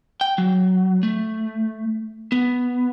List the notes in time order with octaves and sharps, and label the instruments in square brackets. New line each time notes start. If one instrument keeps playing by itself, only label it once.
[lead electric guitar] G5
F#3
A3
B3